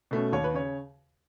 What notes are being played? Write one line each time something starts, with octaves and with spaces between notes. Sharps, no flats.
B2 A3 C#4
D#2 C#5
B4
C#3 C#5